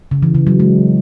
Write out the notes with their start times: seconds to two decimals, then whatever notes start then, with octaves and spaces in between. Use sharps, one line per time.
0.11 C#3
0.23 E3
0.35 C#3
0.47 F#3
0.60 G#3